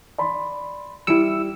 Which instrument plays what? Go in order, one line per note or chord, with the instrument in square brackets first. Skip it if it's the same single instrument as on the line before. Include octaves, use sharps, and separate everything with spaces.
[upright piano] D5 B5 C6
[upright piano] G3 C#7 D7 [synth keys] E4 E6